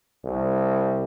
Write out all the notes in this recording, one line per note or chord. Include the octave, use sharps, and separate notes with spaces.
C2